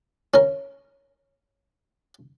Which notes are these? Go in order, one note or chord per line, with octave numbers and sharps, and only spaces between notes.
C#4 A#4